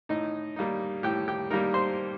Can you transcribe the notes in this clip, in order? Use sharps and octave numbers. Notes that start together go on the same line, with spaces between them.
A2 D#4 D#5
G3 A#3 D#4
A2 G4 G5
G4 G5
G3 A#3 D#4 A#4 A#5
C5 C6